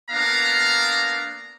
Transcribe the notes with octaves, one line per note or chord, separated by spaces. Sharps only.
A#3 B3 D4 F5 A#5